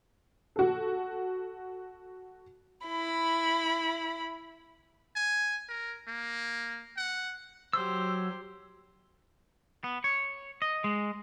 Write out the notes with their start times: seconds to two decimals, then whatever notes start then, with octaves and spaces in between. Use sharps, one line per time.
0.56 F#4 A4
2.87 E4 B5
5.16 G#5
5.69 A#4
6.08 A#3
6.97 F#5
7.73 F#3 G4 C5 E6
9.84 B3
10.04 C#5
10.62 D#5
10.84 G#3